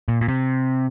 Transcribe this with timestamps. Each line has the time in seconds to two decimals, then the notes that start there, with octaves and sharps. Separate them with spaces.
0.08 A#2
0.21 A#2
0.28 C3